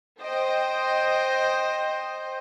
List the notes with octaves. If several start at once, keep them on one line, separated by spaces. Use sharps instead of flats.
C5 D#5 G5